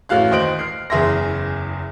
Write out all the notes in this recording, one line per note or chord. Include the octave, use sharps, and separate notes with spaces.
A1 A3 F#4 F5 F#6
D#2 C5 D#5 D7 F#7
F6 C7
F#1 E2 G#4 E5 C6 A#6